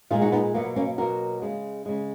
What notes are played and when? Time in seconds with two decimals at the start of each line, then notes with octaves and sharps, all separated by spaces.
0.10 A#2 G#3 F4 G#4
0.22 D#4 F#4
0.32 B3 D#4
0.54 B2 F#3 A#3 B3
0.76 A#3 C#4
0.98 B2 F#3 A#3 F#4 A#4
1.42 C#3 G#3
1.86 C#3 G#3